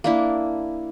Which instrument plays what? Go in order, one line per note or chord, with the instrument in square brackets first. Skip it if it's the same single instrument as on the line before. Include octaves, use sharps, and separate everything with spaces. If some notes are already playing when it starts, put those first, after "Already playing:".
[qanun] A#3 D4 E4